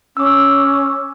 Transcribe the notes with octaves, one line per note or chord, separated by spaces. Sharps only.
C#4 D6 E6